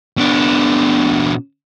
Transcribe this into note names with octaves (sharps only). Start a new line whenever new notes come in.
B2 D4